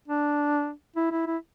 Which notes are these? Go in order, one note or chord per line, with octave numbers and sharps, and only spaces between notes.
D4
E4
E4
E4